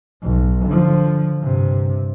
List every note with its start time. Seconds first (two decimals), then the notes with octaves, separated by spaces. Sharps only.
0.23 B1
0.66 D3 F3
1.42 G2 C3